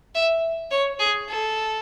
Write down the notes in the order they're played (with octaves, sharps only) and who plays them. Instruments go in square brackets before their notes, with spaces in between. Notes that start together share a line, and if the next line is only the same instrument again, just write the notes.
[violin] E5
C#5
G#4
A4